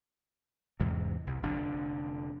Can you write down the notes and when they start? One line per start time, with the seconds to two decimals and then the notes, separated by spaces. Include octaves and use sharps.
0.80 E2 G#2 C3
1.27 C2
1.43 F1 D3 D4